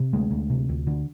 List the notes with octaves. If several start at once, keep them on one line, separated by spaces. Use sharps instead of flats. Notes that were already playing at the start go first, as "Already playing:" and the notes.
Already playing: C3
D2 G#3
D2
C3
D2
D3